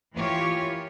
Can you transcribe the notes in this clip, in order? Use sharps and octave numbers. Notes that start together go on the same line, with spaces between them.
E3 A#3 E4 F4 G4 C#5